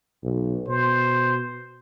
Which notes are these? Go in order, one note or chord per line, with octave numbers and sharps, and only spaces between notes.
B1
B2 C5